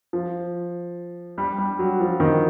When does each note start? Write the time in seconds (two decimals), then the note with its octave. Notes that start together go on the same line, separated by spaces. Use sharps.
0.13 F3
1.38 G3
1.58 G3
1.79 F#3
2.00 F3
2.20 D#3